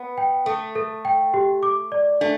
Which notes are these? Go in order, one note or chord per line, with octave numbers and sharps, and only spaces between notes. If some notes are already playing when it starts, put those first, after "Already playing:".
Already playing: B3
G5
A3 A4
A4
G5
G4
D6
D5
A3 D4